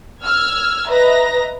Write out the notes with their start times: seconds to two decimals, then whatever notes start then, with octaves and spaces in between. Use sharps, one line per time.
0.23 E6 F6 G#6
0.87 B4 D#5 E5 A#5 A#6